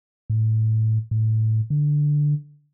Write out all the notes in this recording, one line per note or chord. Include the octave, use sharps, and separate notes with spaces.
A2
A2
D3